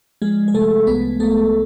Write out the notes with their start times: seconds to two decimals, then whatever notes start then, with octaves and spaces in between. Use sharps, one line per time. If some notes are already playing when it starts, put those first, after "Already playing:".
0.22 F3 G#3 G#4
0.48 G#4
0.54 C3 A3 A4
0.87 C2 B3 B4
1.20 C2 A3 A4